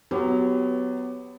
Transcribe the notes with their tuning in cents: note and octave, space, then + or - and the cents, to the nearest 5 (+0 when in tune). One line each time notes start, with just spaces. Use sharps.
F#3 +0 B3 +20 G4 +5